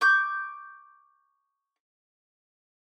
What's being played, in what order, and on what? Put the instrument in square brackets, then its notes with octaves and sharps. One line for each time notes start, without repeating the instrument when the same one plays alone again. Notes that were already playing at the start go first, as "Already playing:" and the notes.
[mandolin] C#6 D6 G6